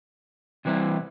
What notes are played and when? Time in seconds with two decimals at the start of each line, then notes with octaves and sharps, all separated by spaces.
0.65 C3 E3 G3 C4 E4